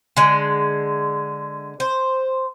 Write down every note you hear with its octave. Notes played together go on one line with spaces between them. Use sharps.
D3 G#3
C5